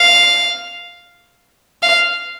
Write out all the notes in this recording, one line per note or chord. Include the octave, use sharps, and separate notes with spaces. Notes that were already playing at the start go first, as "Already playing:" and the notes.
Already playing: F5
F5